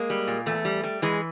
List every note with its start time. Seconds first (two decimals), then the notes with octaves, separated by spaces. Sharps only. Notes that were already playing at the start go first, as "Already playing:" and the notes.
Already playing: G#3 A#3
0.10 G3
0.27 A#2
0.46 E2 A3
0.65 G3
0.83 G3
1.02 E3 G#3